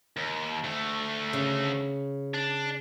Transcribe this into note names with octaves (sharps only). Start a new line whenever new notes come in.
D#2
D2 A3
C#3
D4